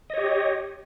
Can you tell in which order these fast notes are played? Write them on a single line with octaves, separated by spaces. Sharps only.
D#5 C#5 G4